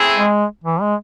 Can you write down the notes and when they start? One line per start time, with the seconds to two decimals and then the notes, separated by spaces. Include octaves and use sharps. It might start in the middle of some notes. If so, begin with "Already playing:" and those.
Already playing: A3 C4 E4 G#4
0.16 G#3
0.64 E3
0.81 G#3